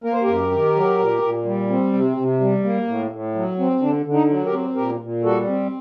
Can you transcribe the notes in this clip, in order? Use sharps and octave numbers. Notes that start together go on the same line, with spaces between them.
A#3 A#4
C5
F#2 G4 A#4
D#3
F#3
A#2
A#2
G3
C4
C3
C3
G3
A#3
A2
A2
F#3
C4
D3 D4
D3
D#4
F#3
G4 A#4
C4
A#2 G4 A#4
A#2
G3 F#4 A4
C4